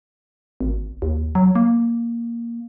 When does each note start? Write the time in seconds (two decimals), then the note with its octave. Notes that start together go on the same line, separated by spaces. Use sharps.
0.61 G#1
1.02 D#2
1.35 F#3
1.55 A#3